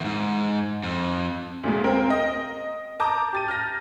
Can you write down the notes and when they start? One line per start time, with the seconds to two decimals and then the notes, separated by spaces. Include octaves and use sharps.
0.01 E2 G#2
0.83 F2
1.63 D2 A#2 G#3
1.84 C4 A#4 G5
2.10 D#5
3.00 A5 A#5 D6 D#6 G6
3.33 G4 A6 D#7
3.48 F6 G6 A#6